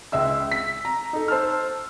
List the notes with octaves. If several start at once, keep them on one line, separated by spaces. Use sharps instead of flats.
C#2 G#3 E5 E6
B6
A#5
D#4 A4
C5 A5 E6 F6